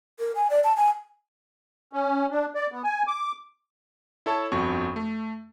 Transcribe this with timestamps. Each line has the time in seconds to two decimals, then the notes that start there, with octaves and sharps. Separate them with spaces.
0.19 A#4
0.35 G#5
0.50 D5
0.64 A5
0.76 G#5
1.93 C#4
2.31 D4
2.55 D5
2.72 B3
2.84 G#5
3.07 D6
4.26 E4 A4 C#5 A5
4.52 G1 F2 F#4 C#6
4.96 A3